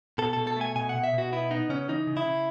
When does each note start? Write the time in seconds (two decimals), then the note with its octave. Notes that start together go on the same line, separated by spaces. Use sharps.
0.18 B2 A4
0.33 B2 A4
0.47 A4
0.56 A3 G#5
0.76 B2 G#5
0.89 F#5
0.95 B2
1.04 E5
1.14 B2 F#4
1.32 B3 E4
1.51 B3 D#4
1.69 C#3 C#4
1.89 E3 D#4
2.07 C#3
2.17 E4
2.26 C#3